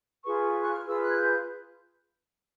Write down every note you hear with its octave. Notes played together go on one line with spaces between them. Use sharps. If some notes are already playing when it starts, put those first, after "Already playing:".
F4 G#4 B4 C#6
F#6
F6
F4 G#4 B4 E6
F#6
G#6
G6